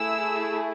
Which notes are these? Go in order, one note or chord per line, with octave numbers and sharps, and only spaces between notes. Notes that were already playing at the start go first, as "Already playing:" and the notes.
Already playing: A3 E4 G#4 E6